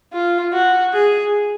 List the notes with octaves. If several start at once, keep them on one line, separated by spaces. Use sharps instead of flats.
F4
F#4
G#4